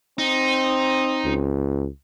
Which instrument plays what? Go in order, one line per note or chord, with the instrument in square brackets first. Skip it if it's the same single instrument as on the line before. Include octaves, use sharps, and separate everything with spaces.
[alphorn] C4 [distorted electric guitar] D#4
[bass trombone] C#2